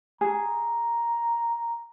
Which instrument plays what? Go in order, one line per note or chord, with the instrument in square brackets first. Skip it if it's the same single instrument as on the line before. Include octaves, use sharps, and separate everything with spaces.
[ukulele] G#4 [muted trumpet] A#5